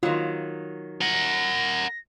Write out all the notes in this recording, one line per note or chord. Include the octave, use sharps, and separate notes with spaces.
D#3 F#3 F4
A#4 F#5 A#6